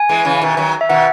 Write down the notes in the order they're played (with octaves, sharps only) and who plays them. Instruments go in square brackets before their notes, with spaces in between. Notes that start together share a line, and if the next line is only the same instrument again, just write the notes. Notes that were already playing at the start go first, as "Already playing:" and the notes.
Already playing: [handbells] G#5
[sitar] E3 G#3
C#3 E3
B2 D#3
D#3 F#3
[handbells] E5
[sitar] B2 D#3 [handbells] F#5